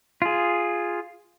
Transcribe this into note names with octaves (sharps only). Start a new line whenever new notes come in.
F4 G#4